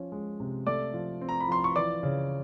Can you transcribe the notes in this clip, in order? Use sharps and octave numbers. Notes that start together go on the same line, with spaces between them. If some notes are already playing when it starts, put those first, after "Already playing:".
Already playing: F3 C#4
G#3
C3
A3 D5 D6
F3
C4
A#5
B5
F3 C6
C#6
E3 D5 D6
C#3